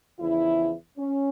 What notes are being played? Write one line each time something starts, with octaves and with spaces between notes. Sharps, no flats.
E2 C#3 F3 E4
C#4